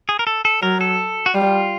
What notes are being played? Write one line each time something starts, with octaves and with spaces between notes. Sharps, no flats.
G#4
A#4
A4
A4
F#3 A#4
A4
F#4
G3 F4